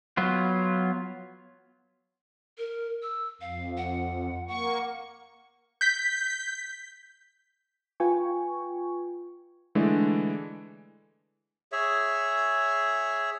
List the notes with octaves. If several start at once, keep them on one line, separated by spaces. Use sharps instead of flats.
F#3 B3 F4
A#4
E6
F2 F5
F#5
A#3 F#5 C#6
G6 B6
F4 B4 G5 G#5 C#6
D3 E3 G#3 A3 D4 E4
G#4 C#5 E5